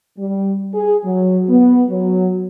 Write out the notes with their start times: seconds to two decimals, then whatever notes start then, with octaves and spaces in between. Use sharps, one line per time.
0.18 G3
0.74 G#4
1.05 F#3
1.49 B3
1.90 F#3